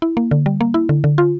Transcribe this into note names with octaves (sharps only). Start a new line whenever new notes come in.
E4
A#3
D3
G3
A#3
E4
D3
D3
F4